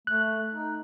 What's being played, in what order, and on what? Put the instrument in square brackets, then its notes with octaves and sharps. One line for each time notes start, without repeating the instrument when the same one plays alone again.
[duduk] A3 [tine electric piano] F#6
[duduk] D#4